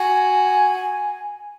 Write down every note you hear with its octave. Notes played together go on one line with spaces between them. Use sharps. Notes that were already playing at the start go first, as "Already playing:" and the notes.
Already playing: F#4 G#5